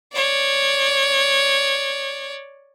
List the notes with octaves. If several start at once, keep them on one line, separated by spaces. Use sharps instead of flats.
C#5 D5